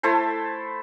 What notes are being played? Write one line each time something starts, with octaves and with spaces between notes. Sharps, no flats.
A3 E4 A4 C5